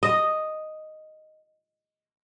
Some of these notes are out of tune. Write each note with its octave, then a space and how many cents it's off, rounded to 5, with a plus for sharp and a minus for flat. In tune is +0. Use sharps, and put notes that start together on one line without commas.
D#5 +0